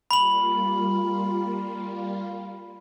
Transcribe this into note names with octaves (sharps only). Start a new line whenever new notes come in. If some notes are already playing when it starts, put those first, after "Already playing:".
G3 A#3 F4 B5 F#7